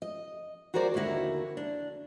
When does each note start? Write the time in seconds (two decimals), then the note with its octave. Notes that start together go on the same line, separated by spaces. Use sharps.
0.02 D#5
0.74 F#4 G#4 A#4 C5 D5
0.94 D#2 D3 A#3 E4 F#4
1.57 D4